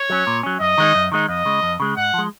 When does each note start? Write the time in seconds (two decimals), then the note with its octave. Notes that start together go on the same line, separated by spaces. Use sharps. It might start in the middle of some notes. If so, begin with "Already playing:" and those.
Already playing: C#5
0.10 F#3 C#4
0.27 A#2
0.43 F#3 C#4
0.60 F#2 D#5
0.78 D#3 G#3 D#4
0.95 F#2
1.12 D#3 G#3 D#4
1.28 F2 D#5
1.45 C#3 G#3
1.63 F2
1.80 C#3 G#3
1.97 G#2 F#5
2.14 F3 G#3